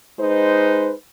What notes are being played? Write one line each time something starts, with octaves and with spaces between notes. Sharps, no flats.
G#3 D#4 B4 C5